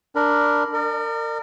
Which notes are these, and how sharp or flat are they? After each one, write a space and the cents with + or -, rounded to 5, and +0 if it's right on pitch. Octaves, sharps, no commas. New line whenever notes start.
D4 +0 A#4 -5 B5 +0
A#4 -25 D5 +40